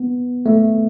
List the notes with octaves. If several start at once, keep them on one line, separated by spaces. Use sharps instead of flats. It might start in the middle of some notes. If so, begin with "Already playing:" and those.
Already playing: B3
A3